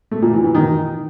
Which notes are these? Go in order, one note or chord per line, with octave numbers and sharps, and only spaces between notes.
A3
A#2
E3
E3
D#3